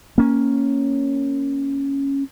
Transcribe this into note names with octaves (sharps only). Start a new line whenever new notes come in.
A#3 C#4